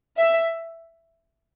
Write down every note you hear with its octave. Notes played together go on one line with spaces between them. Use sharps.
E5